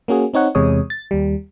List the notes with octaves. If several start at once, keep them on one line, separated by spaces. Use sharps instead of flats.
A#3 C#4 F#4 G#4
C4 D#4 C#5 F#5
E2 C3 G#3 C#5 D#6
A6
D#2 G3